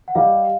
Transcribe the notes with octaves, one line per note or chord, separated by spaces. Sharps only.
F#5
G3 D#5 F5